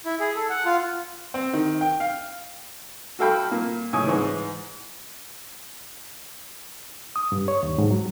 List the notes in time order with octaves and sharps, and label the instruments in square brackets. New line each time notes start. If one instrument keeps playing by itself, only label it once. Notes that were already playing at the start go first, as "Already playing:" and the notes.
[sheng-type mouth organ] E4
G#4
A4
F#5
F4
[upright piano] C4
D#3
G5
F5
[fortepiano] F#4 A4 F5 G5 B5
A#2 A#3
C#2 A2 G#5 D#6
G#2 E3
[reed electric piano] D#6
G2
C#5
D#2
G#2
F#3